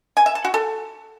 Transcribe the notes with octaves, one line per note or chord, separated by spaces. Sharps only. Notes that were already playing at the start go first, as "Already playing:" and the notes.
G#5
E5
A5
F#4
A4